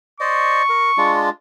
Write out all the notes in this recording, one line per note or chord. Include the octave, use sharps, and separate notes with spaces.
C5 D5 D#5 C#6
A#4
G#3 D4 F4